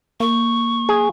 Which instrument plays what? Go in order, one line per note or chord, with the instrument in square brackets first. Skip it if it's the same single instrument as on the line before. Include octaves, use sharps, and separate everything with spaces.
[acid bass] A#3 [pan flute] C#6
[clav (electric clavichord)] G#4